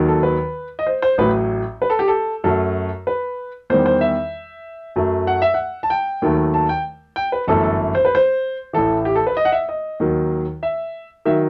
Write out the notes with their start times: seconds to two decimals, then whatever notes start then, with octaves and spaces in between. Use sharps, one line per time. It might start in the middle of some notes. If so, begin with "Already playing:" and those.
Already playing: D#2 D#3 F#3
0.08 A4
0.23 B4
0.79 D#5
0.87 C5
1.02 C5
1.18 A1 A2 F#3 B4
1.82 B4
1.90 A4
1.99 G4
2.08 A4
2.44 F#2 F#3 A3 A4
3.07 B4
3.70 E2 D#3 G3 C5
3.86 C5
4.01 E5
4.96 F#2 F#3 A3
5.27 F#5
5.42 E5
5.54 F#5
5.83 A5
5.90 G5
6.22 D#2 D#3 F#3 A3
6.54 A5
6.69 G5
7.16 G5
7.32 B4
7.47 G1 F#2 E3 A3 A4
7.63 A4
7.95 C5
8.05 B4
8.15 C5
8.73 A1 A2 E3 A4
9.05 G4
9.16 A4
9.27 B4
9.37 D#5
9.45 F#5
9.52 E5
9.69 D#5
10.00 D#2 D#3 F#3
10.63 E5
11.25 D#3 F#3 E5